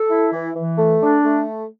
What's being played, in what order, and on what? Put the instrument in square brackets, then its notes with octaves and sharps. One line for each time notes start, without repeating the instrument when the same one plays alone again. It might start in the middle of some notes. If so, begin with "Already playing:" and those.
Already playing: [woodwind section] A4
E4
E3
E3
A3
D4
A3